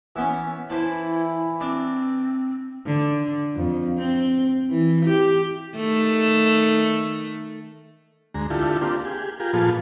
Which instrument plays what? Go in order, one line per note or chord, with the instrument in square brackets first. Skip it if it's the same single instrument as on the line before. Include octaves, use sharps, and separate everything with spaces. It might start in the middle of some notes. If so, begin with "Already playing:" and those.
[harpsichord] E3 B3 C#4
[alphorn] E3 [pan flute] E4 [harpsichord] B4 C5 A5
[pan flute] C4 [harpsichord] D4
[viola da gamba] D3
F2
C4
E3
G4
D#3 A3
[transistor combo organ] D2 G#3 A#5
D3 E4 F4 G4 A4
A#3 C4 D4 F4 G4
G4 G#4
F4 G4 G#4 A#4
A#2 F3 B3 F4 G#4 A4